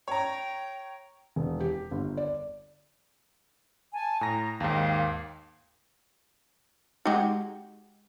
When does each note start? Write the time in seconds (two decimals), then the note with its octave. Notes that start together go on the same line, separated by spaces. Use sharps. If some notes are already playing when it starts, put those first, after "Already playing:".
0.08 C#5 G5 A#5
1.36 E1
1.60 G4
1.91 G1
2.17 D5
3.94 G#5 A5
4.21 A2 A#5 A#6
4.60 D#2 G#2 F5 G5
7.05 G#3 D#4 F#4 G4